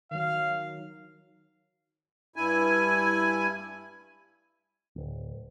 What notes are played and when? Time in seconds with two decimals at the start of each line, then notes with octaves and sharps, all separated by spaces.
0.11 D#3 F#3 F5
2.36 G2 E4 G#5
4.96 D1